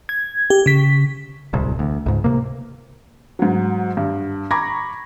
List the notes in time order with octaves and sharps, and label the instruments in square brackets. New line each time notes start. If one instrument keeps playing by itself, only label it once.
[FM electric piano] G#6
G4
C#3 B6
[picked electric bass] D1 C2
D2
C#2 G#2
C3 A#3
[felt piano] G#2 F#3
G2
A#5 B5 C#6 D6 G#6 A#6